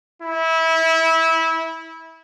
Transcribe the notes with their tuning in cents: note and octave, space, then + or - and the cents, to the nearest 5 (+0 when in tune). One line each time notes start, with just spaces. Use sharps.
E4 -20